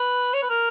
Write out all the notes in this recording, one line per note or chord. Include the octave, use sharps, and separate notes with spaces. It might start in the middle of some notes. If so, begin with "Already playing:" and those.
Already playing: B4
C#5
B4
A#4